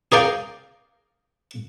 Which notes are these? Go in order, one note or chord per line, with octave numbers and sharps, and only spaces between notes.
G#4 A#4 D5 F5 G5